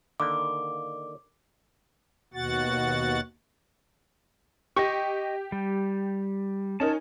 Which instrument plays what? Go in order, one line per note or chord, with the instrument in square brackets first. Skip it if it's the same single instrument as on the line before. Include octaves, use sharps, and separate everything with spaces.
[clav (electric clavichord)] D3 D#3 A#3 [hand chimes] D6
[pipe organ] D#2 B2 F#4 F#5 A6
[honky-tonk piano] G4 [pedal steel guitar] D#5 C#6
[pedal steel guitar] G3
[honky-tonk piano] C#4 D#4 A#4 [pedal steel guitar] A5